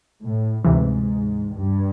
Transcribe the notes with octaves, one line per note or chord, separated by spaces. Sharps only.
A2
D2 G#2 C3 E3
G2